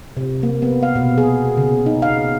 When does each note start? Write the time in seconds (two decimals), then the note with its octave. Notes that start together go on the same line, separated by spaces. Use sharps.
0.17 C3
0.43 A#3
0.62 B3
0.83 F5
0.95 B2
1.18 G#4
1.57 C#3
1.86 D#4
2.02 F5